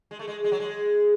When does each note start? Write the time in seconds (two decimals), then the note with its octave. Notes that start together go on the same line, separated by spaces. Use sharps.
0.11 G#3
0.19 A3
0.28 G#3
0.44 G#3
0.52 F#3
0.60 G#3